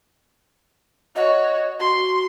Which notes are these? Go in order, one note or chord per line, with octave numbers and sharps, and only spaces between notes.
F#4 C#5 D#5
F#4 C6